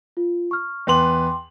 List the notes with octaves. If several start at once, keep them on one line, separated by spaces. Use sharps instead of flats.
F4
C#6 F6
E2 B4 G5 C6 D6 F#7